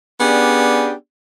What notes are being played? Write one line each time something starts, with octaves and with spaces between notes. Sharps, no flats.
B3 C#4 D4 G4 G#4 D5